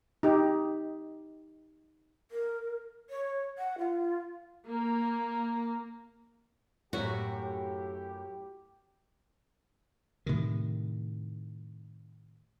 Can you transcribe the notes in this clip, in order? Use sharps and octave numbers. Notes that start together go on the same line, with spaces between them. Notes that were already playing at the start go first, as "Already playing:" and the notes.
D#4 G4
A#4
C#5
F#5
F4
A#3
F#2 A2 F#4 G4
A2 C3 D#3